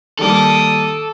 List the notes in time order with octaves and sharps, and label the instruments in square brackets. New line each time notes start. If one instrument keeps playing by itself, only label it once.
[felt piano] D#3 G3 A#3 [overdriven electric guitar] A4 [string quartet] D6 D#6